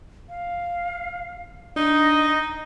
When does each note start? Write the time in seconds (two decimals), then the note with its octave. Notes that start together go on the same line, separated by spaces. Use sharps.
0.29 F5
1.76 D4 D#4 D#5